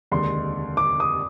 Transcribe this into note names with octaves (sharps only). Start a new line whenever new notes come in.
F1 D#2 D3 G#3 C6
D6
D#6